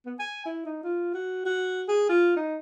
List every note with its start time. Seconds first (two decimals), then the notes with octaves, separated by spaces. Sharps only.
0.06 B3
0.19 G#5
0.46 E4
0.66 D#4
0.84 F4
1.14 F#4
1.46 F#4
1.88 G#4
2.09 F4
2.36 D#4